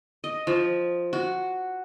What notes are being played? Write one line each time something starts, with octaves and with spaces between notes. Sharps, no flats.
D#5
F3
F#4